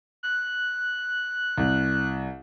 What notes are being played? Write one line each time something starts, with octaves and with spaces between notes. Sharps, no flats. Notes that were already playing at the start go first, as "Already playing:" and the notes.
F#6
C2